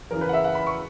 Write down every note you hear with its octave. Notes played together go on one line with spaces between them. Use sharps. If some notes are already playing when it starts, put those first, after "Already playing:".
E2 C#3 E3 A#4
B4
F#5
E5
F#5
B5
C#6